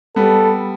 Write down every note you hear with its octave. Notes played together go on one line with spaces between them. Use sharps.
G3 B3 A4